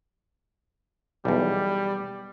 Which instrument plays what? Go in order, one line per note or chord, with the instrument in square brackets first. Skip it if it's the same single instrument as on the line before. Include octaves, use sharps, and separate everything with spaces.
[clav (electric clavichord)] B1 E2 [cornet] G3